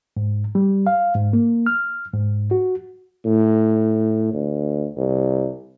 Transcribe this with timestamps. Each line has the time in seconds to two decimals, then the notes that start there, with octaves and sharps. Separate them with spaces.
0.17 G#2
0.55 G3
0.87 F5
1.15 G#2
1.33 A#3
1.66 F6
2.13 G#2
2.51 F#4
3.25 A2
4.33 D2
4.97 C2